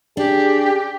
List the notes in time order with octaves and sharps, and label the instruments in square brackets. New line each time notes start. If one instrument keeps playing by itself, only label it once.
[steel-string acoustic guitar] D4 [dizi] G4 [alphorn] G#4